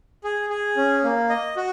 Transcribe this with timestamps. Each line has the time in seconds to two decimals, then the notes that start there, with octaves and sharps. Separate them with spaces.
0.24 G#4
0.50 G#4
0.77 C#4
1.04 A#3
1.30 D#5
1.57 F#4